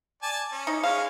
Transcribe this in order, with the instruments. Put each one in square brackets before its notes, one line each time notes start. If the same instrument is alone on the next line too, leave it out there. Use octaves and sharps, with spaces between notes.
[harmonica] D5 G#5 A5
C#4
[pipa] D#4
[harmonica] G#3 C#4 [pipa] F5